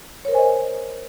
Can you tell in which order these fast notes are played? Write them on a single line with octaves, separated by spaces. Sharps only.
C#5 A#4 C5 G#5 D#5